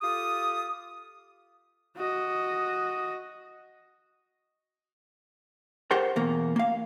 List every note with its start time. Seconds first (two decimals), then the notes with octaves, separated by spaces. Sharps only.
0.02 F4 G4 A4 D#6
1.97 F#4 D#5
5.91 G4 A#4 C5 F#5 G5
6.16 E2 B2 A#3
6.56 A#3 F5